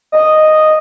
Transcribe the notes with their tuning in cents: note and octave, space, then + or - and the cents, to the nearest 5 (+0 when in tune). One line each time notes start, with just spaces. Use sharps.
D#5 -5